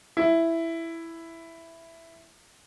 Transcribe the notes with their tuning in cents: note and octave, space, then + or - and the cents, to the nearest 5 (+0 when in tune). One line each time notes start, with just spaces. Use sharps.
E4 +5